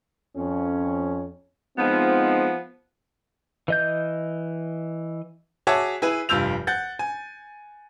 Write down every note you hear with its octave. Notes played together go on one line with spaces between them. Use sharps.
F2 C#4
F3 G#3 B3 C4 D#4
E3 D#5 G6
F#4 G#4 C#5 E5 A5 D6
E4 G#4 B4
F1 G2 F4 E6 G6 F7
F#5 G6 A6
G#5